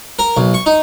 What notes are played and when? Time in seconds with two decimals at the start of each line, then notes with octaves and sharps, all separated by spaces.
0.19 A#4
0.37 B1
0.54 C#6
0.66 D#4